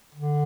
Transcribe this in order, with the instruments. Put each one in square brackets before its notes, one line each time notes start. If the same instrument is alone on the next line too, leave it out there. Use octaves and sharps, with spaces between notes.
[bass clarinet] D3